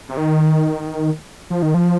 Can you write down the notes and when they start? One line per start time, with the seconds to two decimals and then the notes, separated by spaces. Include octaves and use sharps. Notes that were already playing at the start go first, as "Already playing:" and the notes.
0.09 C3
0.17 D#3
1.50 F3
1.62 D#3
1.74 F3